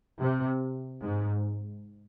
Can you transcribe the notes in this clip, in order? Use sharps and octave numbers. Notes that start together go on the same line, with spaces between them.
C3
G#2